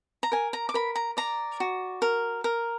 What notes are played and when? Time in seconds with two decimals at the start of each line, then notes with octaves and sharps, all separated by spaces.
0.23 A#5
0.32 A#4 G#5
0.53 A#5
0.69 D6
0.74 A#4 B5
0.95 A#5
1.17 D5 A#5
1.60 F#4
2.02 A#4
2.44 A#4